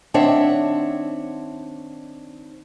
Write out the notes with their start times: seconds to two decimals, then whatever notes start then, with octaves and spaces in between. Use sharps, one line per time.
0.14 D#3 C4 D4 C#5 E5 F#5